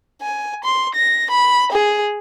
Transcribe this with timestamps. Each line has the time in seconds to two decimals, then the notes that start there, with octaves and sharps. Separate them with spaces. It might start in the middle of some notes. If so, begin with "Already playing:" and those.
0.22 G#5
0.64 C6
0.95 A#6
1.30 B5
1.72 G#4